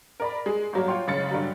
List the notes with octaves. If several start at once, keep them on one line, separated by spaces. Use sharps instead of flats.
A#4 D5 B5
G#3 G#4
G1 F#3 A#3
F4 C#5 G5 C6
F#1 C#3 G#3 C#4 A6 C#7
G2 D3 F#3